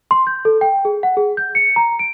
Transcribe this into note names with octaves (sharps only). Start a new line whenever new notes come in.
C6
G6
A4
G5
G#4
F#5
G#4
G6
C#7
A#5
D7